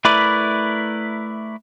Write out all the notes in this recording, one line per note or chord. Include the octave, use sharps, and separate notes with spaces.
A3 E4 A#4 B4 D5